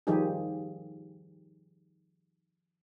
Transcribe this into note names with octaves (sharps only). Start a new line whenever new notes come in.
D#3 F3 G3 D#4 G4 G#4